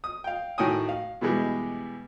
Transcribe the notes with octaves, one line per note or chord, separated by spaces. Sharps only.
D#6
F5 G5
A2 D#3 F#4 G5 G#5 D#6
F5
B2 E3 G3 G#3 B3 G4